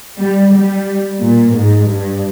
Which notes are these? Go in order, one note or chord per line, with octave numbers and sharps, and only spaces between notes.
G3
G3
A#2
G#2
G2